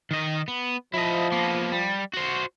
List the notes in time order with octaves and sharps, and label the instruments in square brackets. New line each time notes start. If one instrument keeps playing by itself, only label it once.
[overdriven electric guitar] D#3 D#5
B3
[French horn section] F3 [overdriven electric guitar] E4 D#5
[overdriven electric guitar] A#3 B3
G3
F#4 C5